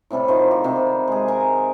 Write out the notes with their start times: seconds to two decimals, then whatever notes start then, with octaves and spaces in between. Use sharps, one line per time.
0.10 A2 C3 G3 A4
0.28 D#3 F3 C5
0.51 G4
0.64 C3 G3
1.08 G#3 G#4
1.28 A#4 G#5 A#5